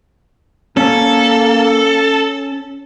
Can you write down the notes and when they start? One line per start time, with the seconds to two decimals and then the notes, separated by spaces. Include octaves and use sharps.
0.77 A#3 C#4 A4